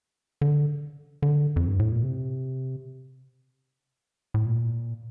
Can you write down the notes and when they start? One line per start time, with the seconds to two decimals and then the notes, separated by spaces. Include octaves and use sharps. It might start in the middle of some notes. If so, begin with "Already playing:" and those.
0.41 D3
1.22 D3
1.56 F2
1.68 G2
1.79 A2
1.92 A#2
2.03 C3
4.34 A2
4.46 A#2